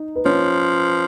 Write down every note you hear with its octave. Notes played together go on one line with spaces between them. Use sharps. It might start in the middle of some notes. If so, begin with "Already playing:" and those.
Already playing: D#4
B4
F3 C#4 C#5